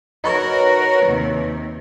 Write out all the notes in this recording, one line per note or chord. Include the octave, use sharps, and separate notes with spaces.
D#4 F#4 A#4 B4 C#5
D#2 C3